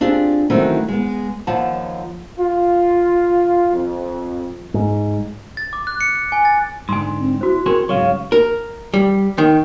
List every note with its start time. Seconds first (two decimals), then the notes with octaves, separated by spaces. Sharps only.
0.01 C4 D4 F4 G4 G#4
0.50 D#3 E3 F#3 A3 C4 C#4
0.88 G#3 B3
1.47 D#2 F3 C#5 F#5 A5
2.38 F4
3.73 F2
4.74 G#2
5.57 A6
5.73 D6
5.87 F#6
6.01 C#7
6.15 C#7
6.32 G#5
6.45 A6
6.89 G#2 D3 G#5 C6
7.18 C4
7.41 E4 F#4 C5
7.66 C4 G#4 A#4 C#5 C6
7.89 G#2 C#3 F#3 F#4 C#5 F5
8.32 A#4
8.94 G3
9.38 D#3